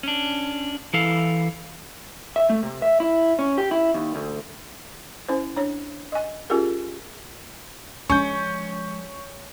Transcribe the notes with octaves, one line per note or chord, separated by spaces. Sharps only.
C#4 D4
E3 E4 A4 F5
E5
A3
C3
E5
E4
C#4
G4
E4
D#2
D2
C#4 E4 C5
D4 C#5
D#5 G#5
C#4 F4 G4 G#4 A#4
F3 G#3 C#4 C#6 G6